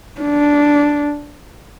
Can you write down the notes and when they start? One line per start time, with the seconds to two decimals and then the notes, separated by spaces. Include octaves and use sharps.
0.21 D4